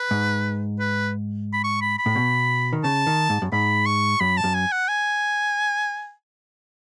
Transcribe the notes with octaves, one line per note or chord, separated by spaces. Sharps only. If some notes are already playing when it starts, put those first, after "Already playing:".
Already playing: B4
G#2
B4
B5
C#6
B5
B5
A2
B2
D#3
C#3 A5
D#3
G#2
F#2
G#2 B5
C#6
F#2 B5
A5
F#2
G#5
F#5
G#5